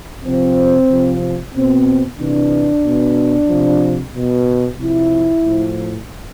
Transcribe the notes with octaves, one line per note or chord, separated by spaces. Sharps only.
C3 F3 C4
C3 F3
B2 C4
C3 E3 D4
B2
C3 F3
B2
C3 F3 E4
A2 F3